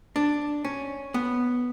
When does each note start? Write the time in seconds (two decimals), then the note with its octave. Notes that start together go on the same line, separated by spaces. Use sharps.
0.16 D4
0.65 C#4
1.14 B3